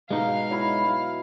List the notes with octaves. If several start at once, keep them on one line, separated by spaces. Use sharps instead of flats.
B2 G#3 D#4 F5
F#3 E4 B5